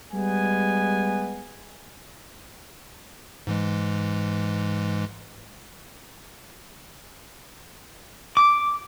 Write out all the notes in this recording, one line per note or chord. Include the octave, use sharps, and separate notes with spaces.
G3 G#3 B3 G#5
G#2 E3 G#3
D6